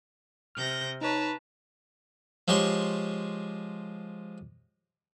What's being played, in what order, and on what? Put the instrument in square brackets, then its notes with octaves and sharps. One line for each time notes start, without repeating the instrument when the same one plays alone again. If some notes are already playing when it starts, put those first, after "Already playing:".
[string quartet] C3 G6 A#6 [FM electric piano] F6
[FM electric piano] D#4 C#5 [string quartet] B4 A5 A#5
[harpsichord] F3 G#3 G4 C#5 C6 C#6